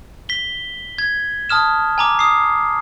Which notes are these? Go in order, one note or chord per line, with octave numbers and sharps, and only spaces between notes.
B6 G7
G#6
A5 D#6 F6 E7
G#5 A#5 D6
D#6 C7